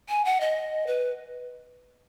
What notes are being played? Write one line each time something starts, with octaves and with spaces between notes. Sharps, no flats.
G#5
F#5
D#5
B4